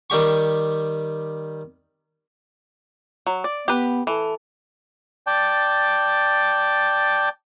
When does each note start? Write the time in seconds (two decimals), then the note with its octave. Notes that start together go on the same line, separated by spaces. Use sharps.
0.10 D#3 G3 G4 C#6
3.26 F#3
3.44 D5
3.68 B3 G4 B4
4.07 E3 A4
5.27 D5 G5 A5